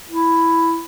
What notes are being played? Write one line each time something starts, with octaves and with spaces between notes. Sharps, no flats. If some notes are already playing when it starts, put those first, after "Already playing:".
E4